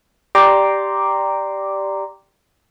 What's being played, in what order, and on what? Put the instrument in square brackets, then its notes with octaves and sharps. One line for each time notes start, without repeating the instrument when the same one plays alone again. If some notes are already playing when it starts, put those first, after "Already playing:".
[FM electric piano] G4 D5 G5 A#5 C6 D6